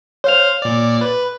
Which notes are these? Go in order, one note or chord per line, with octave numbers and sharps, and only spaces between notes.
C5 C#5 F5 F7
A#2 D5
B4